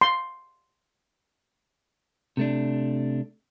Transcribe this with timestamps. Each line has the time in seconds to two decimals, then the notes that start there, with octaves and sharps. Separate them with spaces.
0.01 C6
2.37 C3 A3 D4